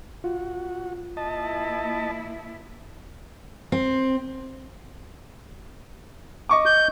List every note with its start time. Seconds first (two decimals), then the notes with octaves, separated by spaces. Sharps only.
0.24 F4 F#4
1.17 A#3 E4 D#5 A5
3.72 C4
6.49 D#5 C#6 D6
6.66 G6